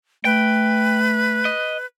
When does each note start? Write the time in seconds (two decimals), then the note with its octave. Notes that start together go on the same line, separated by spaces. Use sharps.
0.25 A3 B4 G5
1.45 D#5